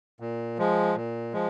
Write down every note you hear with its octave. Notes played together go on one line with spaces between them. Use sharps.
A#2
F3 G#3
A#2
F3 G#3